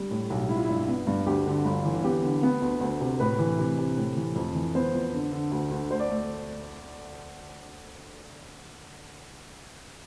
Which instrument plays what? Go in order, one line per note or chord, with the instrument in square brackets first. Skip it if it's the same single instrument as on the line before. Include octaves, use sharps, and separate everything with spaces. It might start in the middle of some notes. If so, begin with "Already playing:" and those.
Already playing: [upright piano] G3
A2
B1
G3 E4
F4
G2 E4
B3
G2
D2 G4
D3
G1
E3
B3 G4
D3
B3
D2
D2
C3
A2 B4
E3
C3
C3
A2
E3
F2
E3
B3 C5
F2
D3
D3
D2
D2
A3 C5
D5
A3